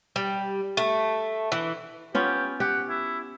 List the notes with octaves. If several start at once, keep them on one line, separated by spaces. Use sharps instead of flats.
G3
A3
E3
B3 C#4 F4 G4
G4 F#5
E4